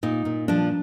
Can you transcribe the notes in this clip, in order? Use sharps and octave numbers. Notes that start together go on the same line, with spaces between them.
A#2 D#4
A#2
F3 D4